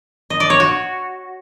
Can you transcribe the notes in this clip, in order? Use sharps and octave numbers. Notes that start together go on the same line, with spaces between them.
D#5
D5
C#5
F#4